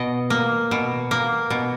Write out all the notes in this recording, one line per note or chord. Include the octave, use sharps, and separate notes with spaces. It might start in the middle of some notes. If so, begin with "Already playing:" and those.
Already playing: B2 D#5
A#3
B2
A#3
B2